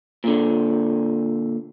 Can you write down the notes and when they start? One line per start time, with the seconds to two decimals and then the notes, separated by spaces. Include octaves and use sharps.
0.24 A#2 D3